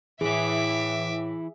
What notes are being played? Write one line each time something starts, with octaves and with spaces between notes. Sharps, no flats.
A2 E3 E4 G#4 E5 D6